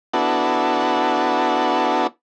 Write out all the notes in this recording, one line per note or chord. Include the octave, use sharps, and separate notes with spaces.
B3 D4 E4 F#4 A4